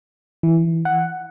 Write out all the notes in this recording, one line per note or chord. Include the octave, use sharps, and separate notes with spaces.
E3
F#5